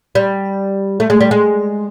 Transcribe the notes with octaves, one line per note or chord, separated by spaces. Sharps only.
G3
A3
G#3
G3
G#3